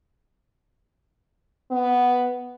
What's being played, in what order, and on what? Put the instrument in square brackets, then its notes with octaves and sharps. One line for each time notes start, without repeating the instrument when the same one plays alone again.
[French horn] B3